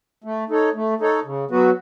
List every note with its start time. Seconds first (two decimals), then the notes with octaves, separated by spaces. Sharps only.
0.24 A3
0.50 D#4 A4 C#5
0.74 A3
1.00 D#4 A4 C#5
1.25 C#3
1.51 F#3 B3 F#4 B4